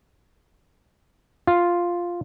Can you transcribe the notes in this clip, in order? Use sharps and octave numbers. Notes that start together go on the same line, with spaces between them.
F4